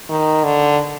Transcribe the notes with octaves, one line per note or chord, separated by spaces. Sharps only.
D#3
D3